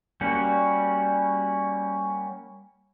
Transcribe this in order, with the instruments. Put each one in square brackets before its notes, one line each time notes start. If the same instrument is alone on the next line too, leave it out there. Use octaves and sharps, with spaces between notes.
[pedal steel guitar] G3 A#3 C#4 F#4